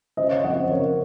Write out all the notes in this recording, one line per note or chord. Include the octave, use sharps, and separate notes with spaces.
C#3 C5 D#5
C#5 F5
F3 C4 D#5 F#5
C5 D#5
C#3 A#4 C#5